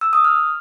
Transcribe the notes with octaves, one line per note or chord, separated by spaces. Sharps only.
E6
D#6
F6